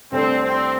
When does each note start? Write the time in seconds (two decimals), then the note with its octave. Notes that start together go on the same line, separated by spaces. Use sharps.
0.12 C2 C3 A3 C4 D4 A4
0.43 C4